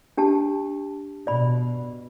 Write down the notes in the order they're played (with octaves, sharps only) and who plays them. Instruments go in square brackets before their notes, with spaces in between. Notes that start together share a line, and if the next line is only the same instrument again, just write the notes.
[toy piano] D4 G4 A5
[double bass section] B2 [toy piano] D5 B5